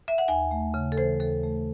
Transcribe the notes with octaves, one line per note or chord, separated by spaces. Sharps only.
E5
F#5
D#2 G#5
A3
C#3
A4
E3 C5
D#2 A4
A3